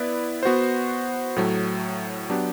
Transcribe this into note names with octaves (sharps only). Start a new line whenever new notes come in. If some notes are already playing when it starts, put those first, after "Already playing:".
Already playing: B3 E4 B4 D5
B3 F#4 C5
A2 F#3 A3
F#3 B3 D4 G4